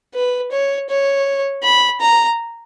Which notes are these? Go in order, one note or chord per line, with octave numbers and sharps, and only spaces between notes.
B4
C#5
C#5
B5
A#5